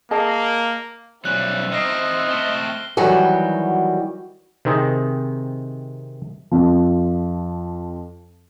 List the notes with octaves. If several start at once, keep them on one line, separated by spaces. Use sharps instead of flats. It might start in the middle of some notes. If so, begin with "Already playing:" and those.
A#3 G#4 D#5 A5
B1 G3 C#4 C5 E5 F#6
C4 D#4 D#5 F6 A#6 C7
A3 C4 G7
D#3 E3 F#3 G3 F#4 G4
C3 D#3 C4 D#4 G#4 D#5
F2 F3